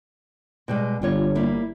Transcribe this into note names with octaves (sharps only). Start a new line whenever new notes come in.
B2 G3 G#3
G1 G3 F4 C#5
G3 A#3 E4